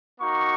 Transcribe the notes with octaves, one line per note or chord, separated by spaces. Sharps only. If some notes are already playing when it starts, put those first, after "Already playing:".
A#3 D#4 F#4 C#6